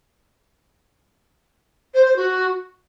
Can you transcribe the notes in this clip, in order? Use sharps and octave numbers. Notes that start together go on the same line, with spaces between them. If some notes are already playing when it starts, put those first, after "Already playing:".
C5
C5
F#4